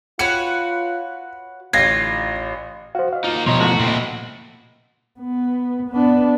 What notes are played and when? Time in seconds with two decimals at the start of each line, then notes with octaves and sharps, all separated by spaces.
0.19 F4 F#4 B4 C#5 C#7
1.73 A1 D3 F4 G#6 A#6 C7
2.95 F#4 C5 F5
3.13 D#5 F5
3.24 A#3 D#4 F4
3.47 B2 F3 G3 C#5 D#5 A#5 C6
3.60 A1 A3 F#4 C#6
3.79 A#2 C4 E4 F#4
5.20 B3
5.91 B3 D4